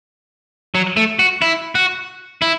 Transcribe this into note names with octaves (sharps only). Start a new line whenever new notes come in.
F#3
A3
F#4
E4
F#4
E4